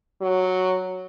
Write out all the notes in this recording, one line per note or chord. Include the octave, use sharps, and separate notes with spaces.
F#3